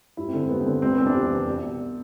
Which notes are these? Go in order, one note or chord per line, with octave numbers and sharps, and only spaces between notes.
G2 E4
C4
D3
C4
G2 B3
C4
D3
C2 C4
B3
C3 E3 C4
D4
C2
C3 E3
C2
B2